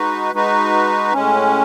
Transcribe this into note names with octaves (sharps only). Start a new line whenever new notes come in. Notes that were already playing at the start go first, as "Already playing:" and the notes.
Already playing: G#3 D#4 F#4 B4
G#3 D#4 F#4 B4
A2 G#3 C#4